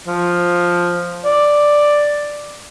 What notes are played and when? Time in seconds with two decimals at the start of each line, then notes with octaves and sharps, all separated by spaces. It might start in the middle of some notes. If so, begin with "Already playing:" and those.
0.07 F3
1.25 D5